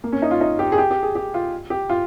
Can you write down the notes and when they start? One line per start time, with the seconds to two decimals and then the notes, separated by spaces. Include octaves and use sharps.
0.04 A#3
0.12 C#4
0.22 D#4
0.31 F4
0.41 D#4
0.59 G4
0.72 G#4
0.78 G4
0.91 G4
1.02 G#4
1.15 G4
1.34 F4
1.70 G4
1.89 F4